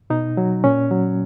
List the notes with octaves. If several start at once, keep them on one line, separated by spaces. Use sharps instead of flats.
B2 D#4
F#3
A#2 C#4
F#3